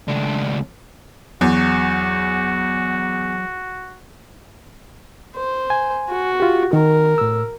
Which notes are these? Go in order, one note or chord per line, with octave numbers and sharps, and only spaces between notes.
C#2 D4
E2 F#3 F#4
C5
G#5
F#4
F4 G4
D#3 A#4
A2 E6